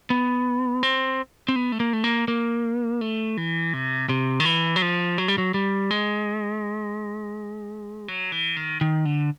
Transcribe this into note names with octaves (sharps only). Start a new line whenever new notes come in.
B3
C4
C4
B3
A3
A#3
A3
A#3
A#3
A3
E3
C3
C3
D#3
E3
F#3
F3
F#3
G3
F#3
G3
G#3
F#3
E3
D#3
D#3
D3